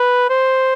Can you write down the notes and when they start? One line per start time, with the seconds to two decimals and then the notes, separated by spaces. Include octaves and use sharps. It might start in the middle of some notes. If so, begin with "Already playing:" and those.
Already playing: B4
0.30 C5